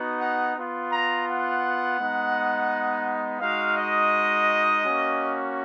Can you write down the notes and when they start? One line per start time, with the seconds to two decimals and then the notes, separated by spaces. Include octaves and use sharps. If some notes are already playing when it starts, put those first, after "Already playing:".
Already playing: B3 D#4 F#4
0.20 F#5
0.54 B3
0.59 F4
0.90 A#5
1.26 F#5
1.98 G#3 B3 D#4
3.40 G#3 D#4 F#4 F5
3.76 D#5
4.83 A#3 C#4 F#4